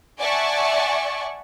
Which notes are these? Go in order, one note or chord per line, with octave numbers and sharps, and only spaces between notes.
D5 E5 F#5 G#5 A5 C#6